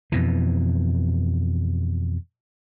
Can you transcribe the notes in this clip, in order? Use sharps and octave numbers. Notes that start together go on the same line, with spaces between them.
F2 B2 E3